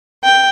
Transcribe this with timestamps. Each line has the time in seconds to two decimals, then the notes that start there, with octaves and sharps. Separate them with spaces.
0.24 G5